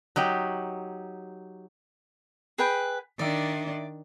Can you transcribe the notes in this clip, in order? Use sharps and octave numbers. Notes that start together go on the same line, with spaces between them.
F#3 D#4 G4
G#4 B4 G5
D#3 D4 D5 E5